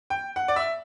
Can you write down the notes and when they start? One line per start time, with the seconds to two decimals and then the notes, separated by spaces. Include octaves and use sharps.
0.10 G5
0.36 F#5
0.48 D5
0.56 E5